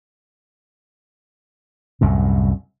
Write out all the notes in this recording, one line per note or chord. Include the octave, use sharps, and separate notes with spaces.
C2 F#2 A2